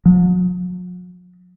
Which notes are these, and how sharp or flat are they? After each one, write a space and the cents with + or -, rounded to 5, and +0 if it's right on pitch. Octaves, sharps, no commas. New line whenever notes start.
F#3 -45